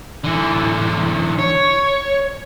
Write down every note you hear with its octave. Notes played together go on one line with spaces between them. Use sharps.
D3 E3
C#5